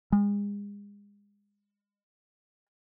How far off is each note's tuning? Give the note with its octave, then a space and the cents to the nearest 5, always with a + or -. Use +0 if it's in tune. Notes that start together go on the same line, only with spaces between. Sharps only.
G#3 -35